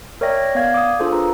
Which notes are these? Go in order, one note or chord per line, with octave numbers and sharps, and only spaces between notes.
A#4 C#5 D5 E5 G5 A#6
B3 D5 F5 G#6
D6 D#6
D4 F4 G#4 A4 C5
F4 B4 A#5